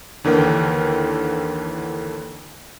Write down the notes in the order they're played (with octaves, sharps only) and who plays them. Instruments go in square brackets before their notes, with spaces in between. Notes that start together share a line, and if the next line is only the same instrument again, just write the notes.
[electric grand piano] D#2 D3 E3 A#4 G5